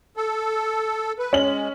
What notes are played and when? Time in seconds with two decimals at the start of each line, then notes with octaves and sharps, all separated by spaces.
0.17 A4
1.19 B4
1.33 G#3 C#4 F#7